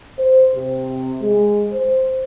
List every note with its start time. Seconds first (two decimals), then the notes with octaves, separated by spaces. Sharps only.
0.19 C5
0.56 C3
1.22 G#3
1.73 C5